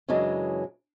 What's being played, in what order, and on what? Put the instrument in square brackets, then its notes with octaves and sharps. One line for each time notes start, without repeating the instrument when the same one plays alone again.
[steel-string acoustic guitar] F#2 C#3 E3 F#3 G#3 D4